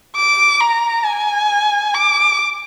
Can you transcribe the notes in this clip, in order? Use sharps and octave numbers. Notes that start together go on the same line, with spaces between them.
D6
A#5
G#5
D6